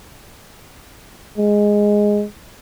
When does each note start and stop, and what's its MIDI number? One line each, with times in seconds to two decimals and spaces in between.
1.38 2.25 56